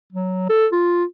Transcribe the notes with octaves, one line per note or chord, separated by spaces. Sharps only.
F#3
A4
F4